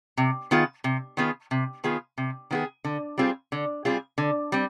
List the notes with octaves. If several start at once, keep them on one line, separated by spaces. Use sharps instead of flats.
C3
D#3 B3 F4 G#4
C3
D#3 B3 F4 G#4
C3
D#3 B3 F4 G#4
C3
D#3 B3 F4 G#4
D3
G3 C4 F4 G#4
D3
G3 C4 F4 G#4
D3
G3 C4